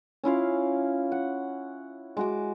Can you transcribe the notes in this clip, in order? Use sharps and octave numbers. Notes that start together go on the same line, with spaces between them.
C#4 E4 F4 F5
F#5
G#3 F#4 D6